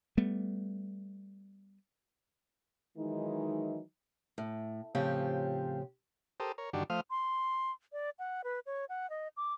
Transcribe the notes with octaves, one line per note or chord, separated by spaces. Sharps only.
G3 A3 B3
D#3 E3 F#3 G#3 D#4 E4
A2
A2 C#3 F3 C4 F4 G4
G4 A4 A#4 C5 D#6
A#4 C#5
G2 D3 D#3 D4 F#4 G4
F3 A3 C5 F5 D#6 F6
C6
D5
F#5
B4
C#5
F#5
D#5
D6